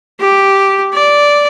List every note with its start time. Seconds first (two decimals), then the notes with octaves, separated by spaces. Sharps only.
0.21 G4
0.94 D5